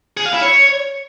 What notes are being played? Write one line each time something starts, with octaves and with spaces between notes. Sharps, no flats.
G#4
F5
E4
C#5